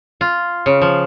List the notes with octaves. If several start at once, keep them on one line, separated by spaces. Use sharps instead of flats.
F4
C#3
F3